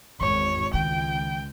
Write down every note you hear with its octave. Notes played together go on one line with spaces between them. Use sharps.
G#1 E2 C#5
C#2 D#3 G5